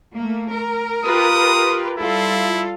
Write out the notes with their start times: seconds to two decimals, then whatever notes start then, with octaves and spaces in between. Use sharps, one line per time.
0.16 A3 A#3
0.52 A#4
1.05 F4 G4 B4 D#6
1.98 G3 E4 F4 A4